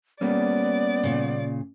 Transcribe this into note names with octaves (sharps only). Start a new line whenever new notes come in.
G3 A#3 B3 C#4 D5
A#2 C#3